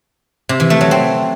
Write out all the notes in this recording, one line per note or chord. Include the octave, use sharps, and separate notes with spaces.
C3
E3
A3
F#3
C4